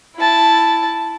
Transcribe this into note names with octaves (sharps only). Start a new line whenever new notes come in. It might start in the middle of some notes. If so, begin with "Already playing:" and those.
E4 A5